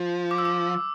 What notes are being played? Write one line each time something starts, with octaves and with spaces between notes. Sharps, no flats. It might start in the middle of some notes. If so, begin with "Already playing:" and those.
Already playing: F3
D6
E6
D6